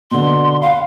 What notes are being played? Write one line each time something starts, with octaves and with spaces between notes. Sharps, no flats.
B2 D3 C6
F5 F#5 B5